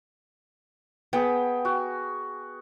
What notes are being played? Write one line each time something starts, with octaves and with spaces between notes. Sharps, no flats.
B3 G#4 G5
F#4